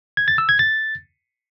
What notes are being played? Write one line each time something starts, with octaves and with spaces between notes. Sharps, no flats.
G#6
A6
E6
G#6
A6